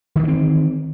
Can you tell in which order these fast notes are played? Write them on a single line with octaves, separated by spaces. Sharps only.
D#3 E3 A3 C4